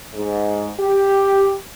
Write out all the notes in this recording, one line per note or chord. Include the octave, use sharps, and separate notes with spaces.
G#2
G4